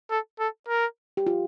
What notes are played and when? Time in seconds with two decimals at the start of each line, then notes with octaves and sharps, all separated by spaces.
0.10 A4
0.39 A4
0.68 A#4
1.17 G4
1.27 F4